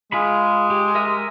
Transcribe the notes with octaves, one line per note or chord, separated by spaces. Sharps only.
G#3 F4 G#4 B5
G4
A#4 E5 G#5